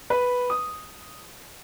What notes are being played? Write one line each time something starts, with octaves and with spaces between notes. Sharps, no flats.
B4
D#6